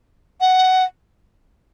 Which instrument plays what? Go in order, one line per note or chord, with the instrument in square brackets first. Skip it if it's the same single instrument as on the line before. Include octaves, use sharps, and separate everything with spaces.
[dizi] F#5